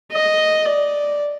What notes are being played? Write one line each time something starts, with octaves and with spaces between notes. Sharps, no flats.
D#5
D5